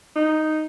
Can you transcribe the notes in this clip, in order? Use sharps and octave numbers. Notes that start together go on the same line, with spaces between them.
D#4